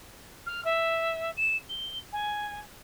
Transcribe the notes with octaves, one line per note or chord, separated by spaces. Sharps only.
F6
E5
E7
G7
G#5